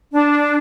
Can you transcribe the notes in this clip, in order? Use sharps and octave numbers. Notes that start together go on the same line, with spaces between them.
D4